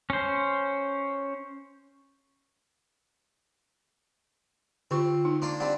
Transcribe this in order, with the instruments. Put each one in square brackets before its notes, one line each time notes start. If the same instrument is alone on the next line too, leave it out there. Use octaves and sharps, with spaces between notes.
[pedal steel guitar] C#4 C5
[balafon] D3 G4 C#6 [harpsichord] C4 [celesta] F4
[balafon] D#4
[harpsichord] A#3 D4 F4 [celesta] C6
[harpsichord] G3 C4 D4 [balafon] F#5